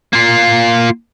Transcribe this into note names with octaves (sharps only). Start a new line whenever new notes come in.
A#3 F4